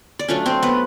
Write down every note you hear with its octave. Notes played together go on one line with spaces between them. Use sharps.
D5
F#3 A3 C#4 D4 F4 C#5
C4 C5
B3 B4